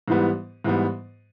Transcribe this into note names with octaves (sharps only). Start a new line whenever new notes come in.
G#2 E3 G3 B3
G#2 E3 G3 B3